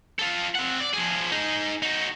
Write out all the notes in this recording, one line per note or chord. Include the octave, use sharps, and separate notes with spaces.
F4 A4
C4 F#5
D5
F3 G#4
D#4 G#4
D#4 F#4